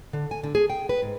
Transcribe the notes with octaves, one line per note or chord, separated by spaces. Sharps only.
D3
G#5
D3
G#4
G5
B4
G#2